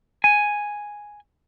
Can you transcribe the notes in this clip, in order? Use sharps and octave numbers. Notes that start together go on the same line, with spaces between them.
G#5